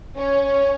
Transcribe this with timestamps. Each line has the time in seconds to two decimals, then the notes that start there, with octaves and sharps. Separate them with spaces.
0.16 C#4 C#5
0.43 C#5